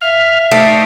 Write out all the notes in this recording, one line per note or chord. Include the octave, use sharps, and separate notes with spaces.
E5 F5 F6
A3 D#4 C5 D5